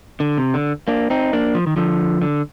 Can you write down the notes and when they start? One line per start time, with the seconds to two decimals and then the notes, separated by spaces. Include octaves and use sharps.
0.20 D3
0.38 C3
0.54 D3
0.88 A#3 D4
1.10 C4 D#4
1.33 A#3 D4
1.55 F3
1.67 D#3
1.76 D3 F3
2.22 D3